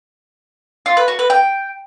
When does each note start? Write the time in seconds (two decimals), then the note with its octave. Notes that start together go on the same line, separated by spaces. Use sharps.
0.86 F4
0.97 B4
1.08 F#4
1.19 B4
1.30 G5